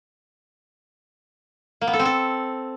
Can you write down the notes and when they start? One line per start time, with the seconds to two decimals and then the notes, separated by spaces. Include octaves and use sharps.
1.81 A#3
1.87 B3
1.93 A4
1.99 C4
2.05 A4